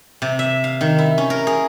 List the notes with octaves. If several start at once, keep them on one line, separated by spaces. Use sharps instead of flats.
C3
E5
F5
D#3
E4
C#4
A#4
G#4